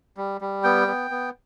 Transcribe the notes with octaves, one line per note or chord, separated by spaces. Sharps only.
G3
G3
B3 G5
B3
B3